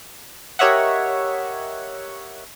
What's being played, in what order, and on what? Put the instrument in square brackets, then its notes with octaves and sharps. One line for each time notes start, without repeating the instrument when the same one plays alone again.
[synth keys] G4 A#4 C#5 D#5 E5 F#5